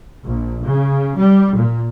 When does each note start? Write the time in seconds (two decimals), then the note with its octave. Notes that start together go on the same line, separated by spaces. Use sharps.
0.25 A#1
0.65 C#3
1.17 G3
1.57 A#2